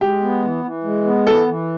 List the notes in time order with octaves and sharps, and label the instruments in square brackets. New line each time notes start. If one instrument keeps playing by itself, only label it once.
[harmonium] G#3 [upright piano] G4
[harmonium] B3
E3
E3
G#3
B3
[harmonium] E3 [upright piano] A4
[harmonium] E3